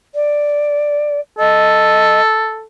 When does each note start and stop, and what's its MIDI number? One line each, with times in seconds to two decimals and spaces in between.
0.15 1.20 74
1.39 2.65 69
1.39 2.21 75